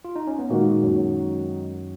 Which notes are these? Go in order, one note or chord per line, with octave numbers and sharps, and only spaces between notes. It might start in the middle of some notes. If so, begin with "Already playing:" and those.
F4
D#4
C#4
B3
A#2 D#3 G#3 A#3 D#4 F#4
F#2 F#3